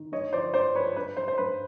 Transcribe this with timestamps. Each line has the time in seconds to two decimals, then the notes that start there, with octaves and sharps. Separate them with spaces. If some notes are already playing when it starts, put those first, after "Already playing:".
Already playing: D#3
0.12 G2 C#5 D#5
0.33 F3 C5 D5
0.54 G2 C5 D5
0.75 F3 B4 C#5
0.96 G2 B4
1.17 G2 C5
1.28 C5
1.38 G2 B4